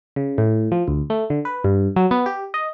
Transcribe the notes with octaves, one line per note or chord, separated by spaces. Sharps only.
C#3
A2
F3
D2
A3
D3
B4
G2
F#3
B3
G4
D#5